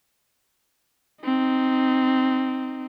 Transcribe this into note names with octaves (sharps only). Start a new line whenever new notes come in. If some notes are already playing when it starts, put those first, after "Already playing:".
C4 D#4